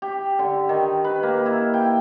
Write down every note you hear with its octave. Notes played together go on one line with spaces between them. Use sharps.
G4
D3
D#3
B4
A#3
E4
G5